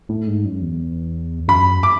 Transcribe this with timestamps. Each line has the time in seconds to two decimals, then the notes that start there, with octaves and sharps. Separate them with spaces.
0.09 A2
0.27 G#2
0.45 F#2
0.62 E2
1.48 F#2 B5
1.83 D6